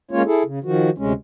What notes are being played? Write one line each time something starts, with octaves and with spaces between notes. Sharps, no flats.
G#3 A#3 C#4 F4 C#5
E4 G#4 A4
C#3
D#3 F3 F#4
D2 C3 G#3 C#4